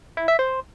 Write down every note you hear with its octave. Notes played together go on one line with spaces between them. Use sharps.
E4
E5
C5